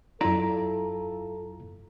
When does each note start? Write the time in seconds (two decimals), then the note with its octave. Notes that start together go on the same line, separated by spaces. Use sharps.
0.21 F#2 E4 F4 A4 D5 A#5